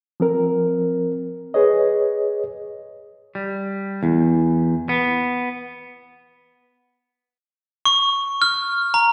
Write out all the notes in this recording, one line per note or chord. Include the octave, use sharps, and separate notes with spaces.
F3 C4 A#4
G#4 B4 C#5 D#5
G3
E2
B3
C#6
F6
A#5